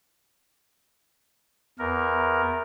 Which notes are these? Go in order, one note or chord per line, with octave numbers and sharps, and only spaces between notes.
E2 A#4